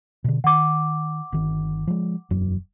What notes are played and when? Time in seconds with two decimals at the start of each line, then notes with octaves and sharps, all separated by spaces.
0.24 B2 D3
0.44 D#3 F#5 D6
1.32 G1 D#3
1.87 F3 G#3
2.30 E1 F#2 F#3